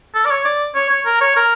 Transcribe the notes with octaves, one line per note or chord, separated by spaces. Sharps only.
A4
D5
C#5
D5
C#5
C#5
A#4
C#5
A#4